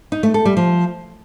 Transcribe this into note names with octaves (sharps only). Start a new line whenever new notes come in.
D#4
A3
A4
G3
F3